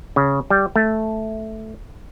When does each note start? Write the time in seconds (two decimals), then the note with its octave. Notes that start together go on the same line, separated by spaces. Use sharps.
0.16 C#3
0.50 G3
0.76 A3